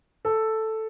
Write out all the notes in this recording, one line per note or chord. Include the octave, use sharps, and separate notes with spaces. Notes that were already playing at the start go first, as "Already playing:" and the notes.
A4